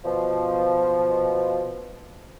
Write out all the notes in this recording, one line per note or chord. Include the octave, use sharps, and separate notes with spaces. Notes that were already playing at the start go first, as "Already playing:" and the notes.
B2 F3